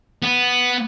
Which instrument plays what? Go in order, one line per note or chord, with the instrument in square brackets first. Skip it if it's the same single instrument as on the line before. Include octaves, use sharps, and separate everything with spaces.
[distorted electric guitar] B3